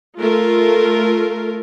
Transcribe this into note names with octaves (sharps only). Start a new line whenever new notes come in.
A3 F4 A#4